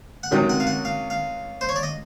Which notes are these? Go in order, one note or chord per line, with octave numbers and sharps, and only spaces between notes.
F#5
C#2 C3 D#3 F#3 G5
F#5
F5
F#5
F5
F5
C5
C#5
D5
D#5